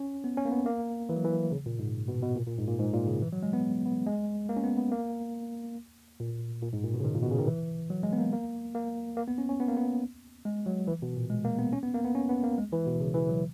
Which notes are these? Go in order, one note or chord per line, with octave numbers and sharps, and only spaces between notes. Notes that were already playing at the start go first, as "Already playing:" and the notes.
Already playing: C#4
B3
C#4
A#3
B3
A#3
E3
F#3
E3
C#3
A#2
G#2
B2
B2
A#2
A#2
G#2
A#2
G#2
A#2
C#3
E3
F#3
G#3
B3
B3
G#3
A#3
C#4
B3
B3
A#3
A#2
A#2
G#2
A#2
B2
C#3
D#3
A#2
B2
C#3
D#3
E3
F#3
G#3
B3
A#3
A#3
A#3
A#3
B3
C#4
C#4
B3
A#3
B3
G#3
F#3
E3
B2
A#2
G#3
A#3
B3
C#4
B3
A#3
B3
C#4
B3
A#3
G#3
E3
B2
C#3
E3
F#3